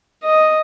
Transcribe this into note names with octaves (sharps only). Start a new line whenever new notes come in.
D#5